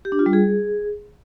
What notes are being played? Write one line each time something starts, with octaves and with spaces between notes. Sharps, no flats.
G4
D4
F4
G3
G#4